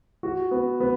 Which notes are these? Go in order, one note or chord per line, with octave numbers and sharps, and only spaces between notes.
F#4
B3
B3